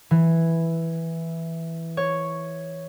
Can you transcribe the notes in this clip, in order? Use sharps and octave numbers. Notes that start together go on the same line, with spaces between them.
E3
C#5